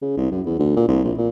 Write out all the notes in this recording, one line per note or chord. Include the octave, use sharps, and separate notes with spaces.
C#3
C2
F#2
E2
D2
A#2
C2
A#1
A#2